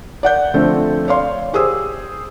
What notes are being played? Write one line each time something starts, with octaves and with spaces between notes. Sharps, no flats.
D5 F#5 G6
D3 F3 A3 C4 A4
C#5 D5 F5 C6
G4 G#4 C5 D#6 E6